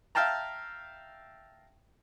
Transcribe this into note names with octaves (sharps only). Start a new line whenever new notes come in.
E5 F5 G5 A5 A#5